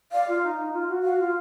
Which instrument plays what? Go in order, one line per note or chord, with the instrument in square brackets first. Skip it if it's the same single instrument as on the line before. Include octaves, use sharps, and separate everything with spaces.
[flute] D5 [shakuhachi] F5
[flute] F4
D#4
D#4
F4
F#4
[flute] F#4 [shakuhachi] F5
[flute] F4